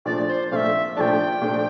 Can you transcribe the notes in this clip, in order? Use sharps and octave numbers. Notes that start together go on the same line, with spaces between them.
A#2 F3 A3 D4 D5
C5
A#2 F3 A3 D4 E5 F5
A#2 F3 A3 D4 G5 A5
A#2 F3 A3 D4